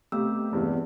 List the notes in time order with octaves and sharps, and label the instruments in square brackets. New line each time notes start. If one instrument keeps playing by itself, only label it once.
[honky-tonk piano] C3 G4 [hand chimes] A3 B3 E6
[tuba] E2 [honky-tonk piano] G2 C3 G#3